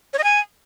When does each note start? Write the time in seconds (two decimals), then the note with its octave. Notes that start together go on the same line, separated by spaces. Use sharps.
0.13 C#5
0.18 D#5
0.24 G#5